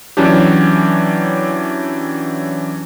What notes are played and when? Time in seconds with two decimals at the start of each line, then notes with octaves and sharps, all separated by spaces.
0.17 E3 F#3 C#4 D4 G4